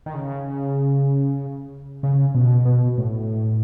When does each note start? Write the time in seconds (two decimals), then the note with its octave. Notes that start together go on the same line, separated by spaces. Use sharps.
0.06 D#3
0.14 C#3
2.03 C#3
2.35 B2
2.65 B2
2.98 A2